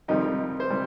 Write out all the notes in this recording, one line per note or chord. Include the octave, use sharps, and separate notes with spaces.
F2 C3 D#3 G3 D#4
C5
C3 G3